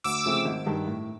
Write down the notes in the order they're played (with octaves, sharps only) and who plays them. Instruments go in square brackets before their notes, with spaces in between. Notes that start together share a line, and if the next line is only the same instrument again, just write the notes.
[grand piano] D2 [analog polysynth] D6 E6
[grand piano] C#3 F3 A3 C4
G#1
G2 D#3
A2